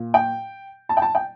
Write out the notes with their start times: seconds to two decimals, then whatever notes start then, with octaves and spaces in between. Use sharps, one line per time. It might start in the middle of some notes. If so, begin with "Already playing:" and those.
Already playing: A#2
0.14 G5
0.89 A5
0.97 G5
1.02 A5
1.15 G5